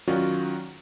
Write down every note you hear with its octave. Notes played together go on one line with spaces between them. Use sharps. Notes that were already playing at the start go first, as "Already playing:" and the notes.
D#3 F#3 C#4 F4 F#4 D5